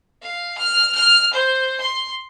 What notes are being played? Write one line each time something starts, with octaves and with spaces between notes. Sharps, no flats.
F5
F6
F6
C5
C6